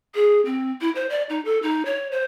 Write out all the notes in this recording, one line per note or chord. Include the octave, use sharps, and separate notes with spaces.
G#4
C4
E4
C5
D5
D#4
A4
D#4
C#5
C5